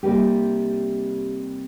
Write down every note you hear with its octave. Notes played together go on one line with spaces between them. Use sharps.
C3 G3 A#3 D#4 G4